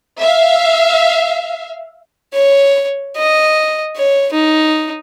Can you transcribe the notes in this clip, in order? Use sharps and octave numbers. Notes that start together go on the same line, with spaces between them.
E5 F5
C#5
D#5
C#5
D#4